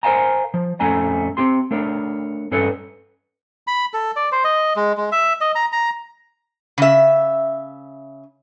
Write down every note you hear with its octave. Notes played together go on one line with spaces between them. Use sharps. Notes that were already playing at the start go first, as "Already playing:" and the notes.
A#4 C5 D#5 F5 G#5 A#5
F3
F2 A3 C#4 G#5 A#5
C4 G4 C6
A3 D4 A#4 C#5
G2 C#4 A4 B4 C#5
B5
A4
D5
C5
D#5
G#3
G#3
E5
D#5
A#5
A#5
C#3 E5